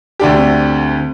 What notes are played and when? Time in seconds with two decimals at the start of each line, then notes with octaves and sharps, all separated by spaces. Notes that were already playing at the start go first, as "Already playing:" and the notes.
0.20 D2 D3 A3 D4 G4
0.38 C4